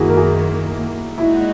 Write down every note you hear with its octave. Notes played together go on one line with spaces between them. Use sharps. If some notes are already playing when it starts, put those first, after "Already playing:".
Already playing: F#2 D#3 A#3 E4 F#4 G#4
A#4
G#4
A#2 G#3 D#4 E4 F#4